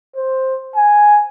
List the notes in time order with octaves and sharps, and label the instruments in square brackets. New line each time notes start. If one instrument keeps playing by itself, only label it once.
[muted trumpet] C5
G#5